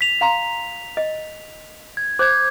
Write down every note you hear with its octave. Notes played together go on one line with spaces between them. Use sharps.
B6 F7
F5 A#5 C6
D#5
G#6
C5 D6 G6 G#6